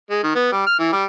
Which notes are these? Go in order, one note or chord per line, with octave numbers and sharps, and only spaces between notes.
G#3
D#3
B3
G3
F6
E3
G3